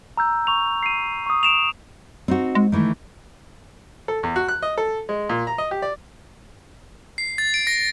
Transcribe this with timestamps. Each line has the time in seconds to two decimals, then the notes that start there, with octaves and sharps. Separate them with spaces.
0.17 A#5 E6 G6
0.47 C#6 F7
0.83 C7 D#7
1.26 C#6 D#6
1.43 D7 E7 F7
2.28 C4 D#4 F#4
2.55 G#3
2.72 D#3 E3 A3
4.08 A4
4.23 E2
4.36 F#4
4.48 F#6
4.62 D#5
4.78 A4
5.09 G#3
5.29 A#2
5.47 A#5
5.58 D#5
5.71 G4
5.82 D5
7.18 C7
7.38 A6
7.54 D7
7.67 A#6